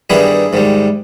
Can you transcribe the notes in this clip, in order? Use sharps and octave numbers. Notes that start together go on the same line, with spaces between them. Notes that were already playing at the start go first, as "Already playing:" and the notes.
G2 D#3 G3 B3 D#4 E4 G#4
G#2 D#3 G3